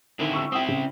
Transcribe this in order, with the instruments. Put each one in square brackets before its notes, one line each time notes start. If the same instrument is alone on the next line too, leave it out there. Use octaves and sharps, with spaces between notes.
[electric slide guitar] D3 C4 E4 [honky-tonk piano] D#3
[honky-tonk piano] C#6 E6
[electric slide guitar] C4 E4 [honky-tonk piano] G5 D#6
[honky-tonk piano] C#3